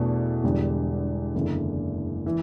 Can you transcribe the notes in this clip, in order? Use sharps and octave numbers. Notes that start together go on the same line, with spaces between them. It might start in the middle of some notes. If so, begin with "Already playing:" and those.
Already playing: E2 B2 A3 D4
E1 E2 D3 G3
F#1 E2 D3
E3